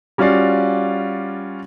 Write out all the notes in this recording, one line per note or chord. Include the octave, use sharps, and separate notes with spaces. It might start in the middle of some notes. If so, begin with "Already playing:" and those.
G3 C#4 F4 F#4 D5 F5